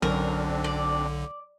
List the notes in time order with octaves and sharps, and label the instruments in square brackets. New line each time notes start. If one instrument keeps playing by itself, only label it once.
[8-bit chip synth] B1 D3 [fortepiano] F#2 [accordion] C4 D4 [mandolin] A#4
[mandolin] D5